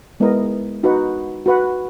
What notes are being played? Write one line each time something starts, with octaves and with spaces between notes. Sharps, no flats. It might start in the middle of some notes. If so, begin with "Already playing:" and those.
G#3 B3 E4 A#4 D#5
D#4 F#4 B4 F#5
F#4 B4 F#5